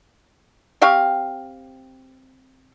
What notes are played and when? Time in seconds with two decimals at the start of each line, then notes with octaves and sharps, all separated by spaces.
0.81 C4 G4 F5 C#6